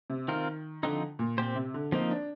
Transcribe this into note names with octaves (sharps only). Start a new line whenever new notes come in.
C3
D#3 C4 F4 A#4
D3 F3 C4 D#4
A#2
A#2 C4 G4 C5
C3
D3
F3 A#3 C4 D#4
D4